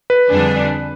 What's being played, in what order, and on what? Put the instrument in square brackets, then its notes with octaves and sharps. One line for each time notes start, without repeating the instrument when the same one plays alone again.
[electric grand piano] B4
[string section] F2 D3 G3 D4 G#4